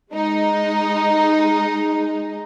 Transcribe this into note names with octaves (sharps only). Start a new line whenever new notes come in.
G#3 D#4